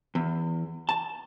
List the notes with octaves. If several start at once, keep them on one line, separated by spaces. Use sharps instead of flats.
E2
A5